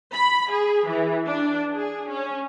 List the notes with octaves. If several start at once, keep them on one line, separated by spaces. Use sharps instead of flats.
B5
G#4
E3
D4
G#4
C#4